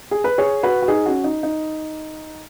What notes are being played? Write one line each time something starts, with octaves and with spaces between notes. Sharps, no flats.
G#4
B4
G#4 C#5
F#4 B4
F#4
D#4 G#4
C#4 F#4
D#4
D#4